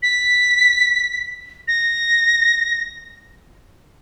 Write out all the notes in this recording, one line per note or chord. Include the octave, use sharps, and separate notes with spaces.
B6
A#6